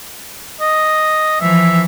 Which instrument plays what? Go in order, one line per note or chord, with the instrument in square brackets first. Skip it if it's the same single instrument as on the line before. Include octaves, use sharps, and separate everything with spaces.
[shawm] D#5
[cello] E3 F3 [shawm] E5